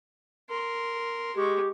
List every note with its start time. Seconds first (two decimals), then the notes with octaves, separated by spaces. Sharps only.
0.50 A#4 C6
1.36 G#3 G4 C#6